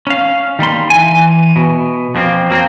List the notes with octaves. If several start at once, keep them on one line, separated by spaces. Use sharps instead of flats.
C#4 F5
D#3 G3 A#3 C6
E3 G#5
B2
F2 F3 A#3 C4
F#3 A#3 C4